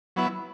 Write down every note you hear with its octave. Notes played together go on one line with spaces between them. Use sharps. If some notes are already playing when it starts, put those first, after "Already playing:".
F#3 B3 E4